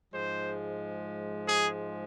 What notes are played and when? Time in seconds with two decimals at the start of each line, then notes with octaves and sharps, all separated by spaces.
0.11 G#2 F3 G#3 C5
1.47 G#4